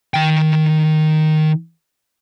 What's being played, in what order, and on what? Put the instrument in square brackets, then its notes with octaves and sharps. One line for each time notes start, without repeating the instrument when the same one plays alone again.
[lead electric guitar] D#3 G5